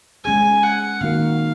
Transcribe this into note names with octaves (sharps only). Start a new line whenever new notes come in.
G#3 C#4 G#4 G#5
F#5
D#3 A#3 D#4 F#4 A#4 F5